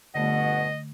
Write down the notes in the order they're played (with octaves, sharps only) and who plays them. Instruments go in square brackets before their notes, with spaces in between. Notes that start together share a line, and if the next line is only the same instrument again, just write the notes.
[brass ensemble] G1 B2 F#5 [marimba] D3 A3 [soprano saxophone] D#5